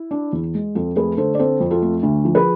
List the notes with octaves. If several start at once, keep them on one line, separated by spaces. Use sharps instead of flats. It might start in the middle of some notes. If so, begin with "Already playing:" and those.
Already playing: E4
D4
E2
G#3
F2 F4 A4
A3 G#4 B4
D3 A4 C5
D5
C4 A4 C5
F2
F4 A4
A3
D2
F3
G#4 B4